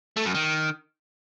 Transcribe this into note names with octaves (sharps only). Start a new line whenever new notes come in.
A3
F#2
D#3